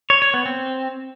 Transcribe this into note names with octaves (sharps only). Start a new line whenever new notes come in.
C#5
C#5
B3
C4